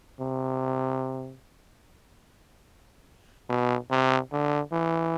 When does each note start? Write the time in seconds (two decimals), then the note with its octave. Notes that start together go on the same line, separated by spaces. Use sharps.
0.20 C3
3.49 B2
3.91 C3
4.32 D3
4.72 E3